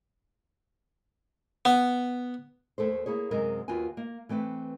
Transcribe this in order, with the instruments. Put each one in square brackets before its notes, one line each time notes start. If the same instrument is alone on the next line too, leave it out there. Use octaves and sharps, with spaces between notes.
[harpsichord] B3
[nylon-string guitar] D#2 A3 A4 C5
A#3 E4 G#4 C#5
F#2 C3 G#3 A#4
D#2 F4 F#4 B4 G#5
A#3
E3 A3 C4 B4